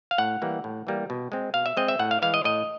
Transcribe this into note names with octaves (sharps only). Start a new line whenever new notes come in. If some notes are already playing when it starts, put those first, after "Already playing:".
F5
A2 F#5
E3 G3 A#3
A2
E3 G3 A#3
B2
G#3 C4
B2 F5
E5
G#3 C4 D#5
E5
A2 F#5
F5
E3 G#3 F5
D#5
A2 D#5